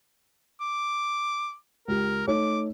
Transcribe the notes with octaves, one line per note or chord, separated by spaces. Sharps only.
D6
C#2 G4 A#4
A3 D#4 C#5 D6